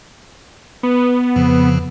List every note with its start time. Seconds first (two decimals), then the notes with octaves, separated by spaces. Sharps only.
0.83 B3
1.36 F2 C#3 F3